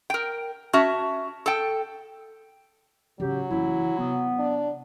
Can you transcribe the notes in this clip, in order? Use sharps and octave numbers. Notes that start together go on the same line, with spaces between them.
A#4 G5
C#4 F#4 E5 A5
A4 G5
A1 C#3 F#3 G4
F#1 E3 E4
C3 B3
D4